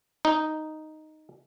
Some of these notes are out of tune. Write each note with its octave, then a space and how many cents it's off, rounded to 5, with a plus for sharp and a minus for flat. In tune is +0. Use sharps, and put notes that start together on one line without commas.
D#4 +0